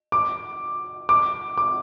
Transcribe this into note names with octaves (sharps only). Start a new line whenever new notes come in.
D6
D6
D6